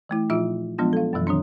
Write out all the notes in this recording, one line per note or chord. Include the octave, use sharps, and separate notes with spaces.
E3 A3 E4
A#2 F3 D#4 F4 E5 E6
F3 F#3 G#3 B3 D4 F4
A4 F5
F#2 B2 E3 F#3
D#3 F#3 C4 D4